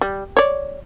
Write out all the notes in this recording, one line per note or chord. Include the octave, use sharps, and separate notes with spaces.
G3
C#5 D5